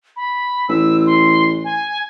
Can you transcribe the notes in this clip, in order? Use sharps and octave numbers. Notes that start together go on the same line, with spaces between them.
B5
A1 E6
C6
G#5